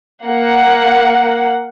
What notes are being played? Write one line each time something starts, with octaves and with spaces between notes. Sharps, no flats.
A#3 F#5